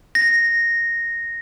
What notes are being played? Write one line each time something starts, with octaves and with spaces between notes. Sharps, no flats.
A#6